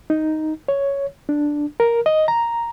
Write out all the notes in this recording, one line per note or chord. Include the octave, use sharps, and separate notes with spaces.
D#4
C#5
D4
A#4
D#5
A#5